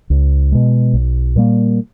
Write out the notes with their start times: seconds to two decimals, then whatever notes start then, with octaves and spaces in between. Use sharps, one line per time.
0.10 C#2
0.52 B2 G#3
0.94 B1
1.36 A#2 G3 A#3